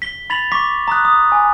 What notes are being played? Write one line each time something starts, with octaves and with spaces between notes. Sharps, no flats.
B6 G7
B5 A6 B6 F7 F#7
C#6 D6 B6
A#5 D#6 F#6
D#6
G#5